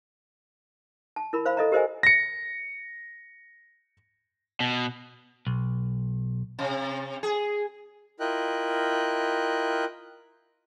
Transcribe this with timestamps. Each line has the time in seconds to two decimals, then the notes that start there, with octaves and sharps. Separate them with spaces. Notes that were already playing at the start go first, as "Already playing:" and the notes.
1.16 A5
1.33 E4 A#4 B5
1.45 C5 F5 B5
1.57 A4 D#5 E5 A#5
1.72 G4 A#4 C5 D#5 E5 G#5
2.03 A#6 C#7
4.60 B2
5.47 B1
6.59 C3
7.23 G#4
8.20 E4 F4 A#4 D#5 G5 F#6